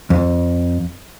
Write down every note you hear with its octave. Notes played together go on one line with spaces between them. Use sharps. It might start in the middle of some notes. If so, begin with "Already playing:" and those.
F2